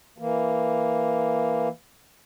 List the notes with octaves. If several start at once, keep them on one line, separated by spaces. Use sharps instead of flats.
E3 A#3